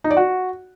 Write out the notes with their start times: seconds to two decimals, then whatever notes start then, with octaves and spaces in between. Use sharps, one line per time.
0.04 D#4
0.10 D5
0.17 F#4